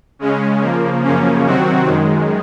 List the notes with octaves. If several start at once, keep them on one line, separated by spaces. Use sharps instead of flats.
C#3 G#3 C#4
C#3 F3 A#3
F#2 C#3 F3 A#3 C#4
C3 D#3 F#3 C4 F#4
F#2 D#3 G#3